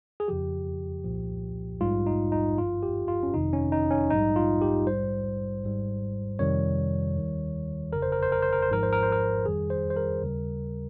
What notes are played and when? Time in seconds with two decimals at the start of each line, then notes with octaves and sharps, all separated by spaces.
0.20 G#4
0.28 F2 C#3 F3 G4
1.04 C2 A#2 F3
1.81 A#1 G#2 G3 F4
2.06 D#4
2.32 D#4
2.57 G1 G2 F3 F4
2.83 G4
3.08 F4
3.23 C#4
3.34 G1 F2 C3 D#3 D#4
3.53 C#4
3.72 D#4
3.91 C#4
4.10 A#1 G#2 G3 D#4
4.36 F4
4.62 G4
4.87 A#1 G#2 G3 C5
5.64 G#1 G#2 G3
6.39 F2 C3 D#3 G3 C#5
7.16 D#2 D#3 G3
7.93 G1 F2 C#3 A#4
8.02 C5
8.12 A#4
8.22 C5
8.32 A#4
8.42 C5
8.53 A#4
8.63 C5
8.69 G#1 G#2 F3 A#4
8.83 C5
8.93 A#4
9.03 C5
9.12 A#4
9.45 F2 D#3 G3 G#4
9.70 C5
9.90 C5
9.96 A#4
10.22 D#2 C#3 G3